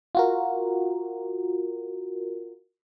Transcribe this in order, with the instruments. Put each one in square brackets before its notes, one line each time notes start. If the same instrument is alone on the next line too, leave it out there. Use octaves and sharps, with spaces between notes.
[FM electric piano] F4 F#4 A#4